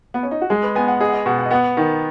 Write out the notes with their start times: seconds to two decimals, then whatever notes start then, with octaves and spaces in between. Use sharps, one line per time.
0.14 B3
0.23 C#4
0.31 D#4
0.41 F#4
0.50 G#3 G#4
0.63 B4
0.75 B3 G#5
0.88 F#5
1.00 G#4 D#5
1.08 F#5
1.13 D#5
1.26 B2 F#5
1.39 F#5
1.45 D#5
1.51 B3 F#5
1.77 D#3 F#5